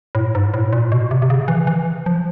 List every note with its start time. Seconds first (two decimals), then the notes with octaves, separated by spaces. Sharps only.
0.15 A2
0.35 G#2
0.54 A2
0.73 A#2
0.92 B2
1.11 C3
1.22 C3
1.30 C#3
1.48 E3
1.67 E3
2.06 F3